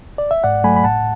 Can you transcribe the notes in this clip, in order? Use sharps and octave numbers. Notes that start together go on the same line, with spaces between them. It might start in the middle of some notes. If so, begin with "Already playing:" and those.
D5
E5
G#2 D5 F#5
F#3 A3 G#5 B5
B5
A2 F#5 A5